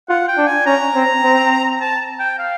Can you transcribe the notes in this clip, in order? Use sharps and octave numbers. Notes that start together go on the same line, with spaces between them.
F4 F#5
G5
D4
G#5
C#4 A#5
C4
C4
A5
G5
F5